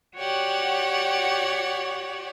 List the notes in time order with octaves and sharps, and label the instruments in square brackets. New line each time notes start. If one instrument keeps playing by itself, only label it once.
[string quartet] F#4 G4 C#5 D5 F#5